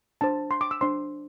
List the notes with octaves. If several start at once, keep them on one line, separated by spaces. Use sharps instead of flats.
D4 C5 A5
C6
D6
E6
D4 C5 C6